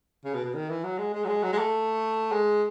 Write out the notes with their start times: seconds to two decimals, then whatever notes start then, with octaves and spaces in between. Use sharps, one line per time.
0.25 C#3
0.34 B2
0.44 B2
0.54 D#3
0.69 E3
0.84 F#3
0.98 G#3
1.14 G#3
1.24 F#3
1.28 G#3
1.43 F#3
1.52 G#3
1.59 A3
2.32 G#3